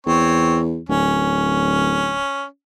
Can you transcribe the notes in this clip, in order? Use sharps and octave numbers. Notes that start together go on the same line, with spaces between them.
E2 C4 C#5
D1 C#4